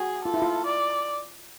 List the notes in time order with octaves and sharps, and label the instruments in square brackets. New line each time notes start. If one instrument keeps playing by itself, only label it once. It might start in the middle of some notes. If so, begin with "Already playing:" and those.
Already playing: [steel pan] F#4 [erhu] G#4
[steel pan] F4 [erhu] A4
[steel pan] E4
F4
[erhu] D5